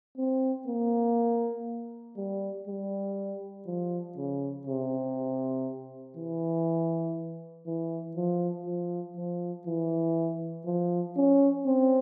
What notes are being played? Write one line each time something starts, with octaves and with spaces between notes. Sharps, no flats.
C4
A#3
G3
G3
F3
C#3
C3
E3
E3
F3
F3
F3
E3
F3
C#4
C4